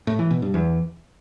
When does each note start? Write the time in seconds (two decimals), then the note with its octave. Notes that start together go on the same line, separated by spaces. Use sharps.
0.07 A2
0.19 E3
0.31 B2
0.42 G2
0.54 E2